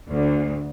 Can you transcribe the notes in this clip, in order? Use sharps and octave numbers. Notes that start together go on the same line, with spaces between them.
D2